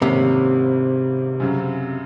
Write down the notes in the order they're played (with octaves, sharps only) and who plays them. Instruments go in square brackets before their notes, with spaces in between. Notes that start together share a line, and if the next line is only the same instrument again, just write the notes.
[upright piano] G#1 G#2 D#3 A#3 C#4 [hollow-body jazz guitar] C3
[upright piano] F#2 C#3 F#3